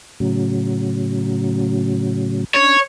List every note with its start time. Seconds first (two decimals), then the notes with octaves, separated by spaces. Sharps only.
0.20 A2 C#3 F#3
2.54 C#4 D4 C#5